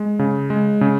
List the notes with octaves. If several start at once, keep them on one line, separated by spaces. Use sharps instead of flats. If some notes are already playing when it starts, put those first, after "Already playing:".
Already playing: G#3
C#3
G#3
C#3